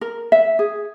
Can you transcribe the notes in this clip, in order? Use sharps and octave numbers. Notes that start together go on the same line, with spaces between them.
A#4
E5
G#4